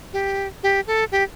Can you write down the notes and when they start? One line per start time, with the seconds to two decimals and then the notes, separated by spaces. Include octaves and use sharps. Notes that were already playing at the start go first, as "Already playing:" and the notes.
0.13 G4
0.63 G4
0.87 A4
1.12 G4